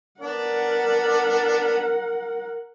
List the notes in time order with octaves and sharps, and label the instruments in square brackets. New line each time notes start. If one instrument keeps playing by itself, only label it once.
[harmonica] B3 D4 D5 [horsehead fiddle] A#4 F#5